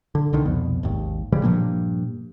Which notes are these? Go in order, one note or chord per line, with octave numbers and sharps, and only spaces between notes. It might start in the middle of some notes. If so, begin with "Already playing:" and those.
D3
C2 D3 D#3
C2 F2 B2
G#1 D#2
A#2 C#3 E3 G3
G2 A#2 F3 A#3